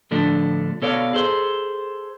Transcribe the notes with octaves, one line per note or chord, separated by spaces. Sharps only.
A2 D3 F3 A3 D4
B2 A4 C#5 D5 F5
G#4 A4 C5